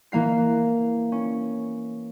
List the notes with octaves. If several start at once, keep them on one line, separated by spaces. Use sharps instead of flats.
E3 A#3 F5 C7
C#4